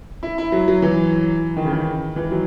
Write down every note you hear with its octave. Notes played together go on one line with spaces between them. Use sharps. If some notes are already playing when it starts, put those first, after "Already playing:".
E4
E4
F#3
F#3
E3
D#3
C#3
D#3
E3
F#3